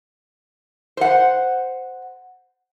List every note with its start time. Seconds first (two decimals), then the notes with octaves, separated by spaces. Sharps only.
0.97 C5 F#5